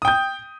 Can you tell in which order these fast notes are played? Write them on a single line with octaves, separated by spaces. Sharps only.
D#6 G5 G6